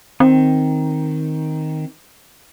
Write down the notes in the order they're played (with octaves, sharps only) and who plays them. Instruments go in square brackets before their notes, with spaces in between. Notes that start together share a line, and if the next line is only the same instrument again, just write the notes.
[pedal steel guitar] D#3 [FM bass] C4